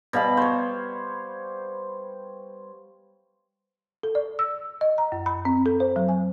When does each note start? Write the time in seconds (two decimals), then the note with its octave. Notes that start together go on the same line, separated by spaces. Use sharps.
0.13 B2 G3 F5 B5
0.37 C5 C#5
4.03 A4
4.15 D5
4.39 E6
4.81 D#5
4.98 A#5
5.12 F#2
5.26 B5
5.45 C4
5.66 A4
5.80 C5
5.96 F#3
6.09 G#5